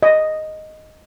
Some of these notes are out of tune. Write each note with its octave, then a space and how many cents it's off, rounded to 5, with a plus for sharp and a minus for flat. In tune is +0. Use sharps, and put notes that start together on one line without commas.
D#5 +0